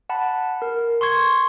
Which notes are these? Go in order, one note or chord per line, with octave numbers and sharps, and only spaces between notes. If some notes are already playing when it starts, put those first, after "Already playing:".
F#5 A5 B5
A#4
C6 C#6 G#6